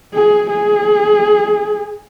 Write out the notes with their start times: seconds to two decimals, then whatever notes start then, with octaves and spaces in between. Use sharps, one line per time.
0.14 G#4
0.50 G#4